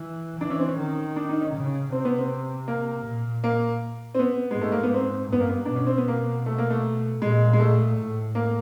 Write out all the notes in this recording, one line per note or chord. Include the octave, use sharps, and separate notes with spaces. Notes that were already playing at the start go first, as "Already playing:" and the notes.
Already playing: E3
E3 D4
C#4
C4
C#4
D#3
D4
D#4
C#4
C#3
C3 C4
B3
C4
A#3
A#2
A#3
C4
B3
G#3
G#2
A3
A#3
B3
C4
G2 B3
A#3
B3
B2 D4
C#4
C4
B3
B2 A#3
A3
A#3
A3
A#2 G#3
G#3
A3
A2
A#3